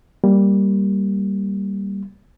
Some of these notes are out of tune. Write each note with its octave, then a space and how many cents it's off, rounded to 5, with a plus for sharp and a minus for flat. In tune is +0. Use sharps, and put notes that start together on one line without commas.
G3 +0 A#3 +0